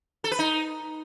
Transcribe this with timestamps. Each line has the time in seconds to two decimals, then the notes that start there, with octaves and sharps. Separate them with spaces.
0.24 A4
0.31 B4
0.39 D#4